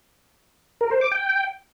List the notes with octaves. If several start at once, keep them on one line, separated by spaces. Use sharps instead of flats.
A#4
C5
D6
G5